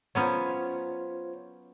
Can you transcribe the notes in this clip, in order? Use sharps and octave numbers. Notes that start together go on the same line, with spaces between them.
F#3 B3 C#4 F4 C5 C#5